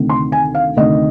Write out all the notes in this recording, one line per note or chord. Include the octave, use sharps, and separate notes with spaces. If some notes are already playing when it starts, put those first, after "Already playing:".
Already playing: D2 C3 D#3
C6
G#5
F5
D2 C3 D#3 D#5